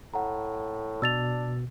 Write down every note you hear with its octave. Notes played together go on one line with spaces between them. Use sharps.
A2 F#5 A#5
B2 D4 E6 A6 F7